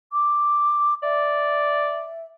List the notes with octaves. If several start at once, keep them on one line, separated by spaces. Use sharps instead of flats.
D6
D5 E5